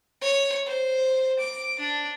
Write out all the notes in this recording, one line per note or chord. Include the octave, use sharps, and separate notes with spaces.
C#5
C5
D6
D4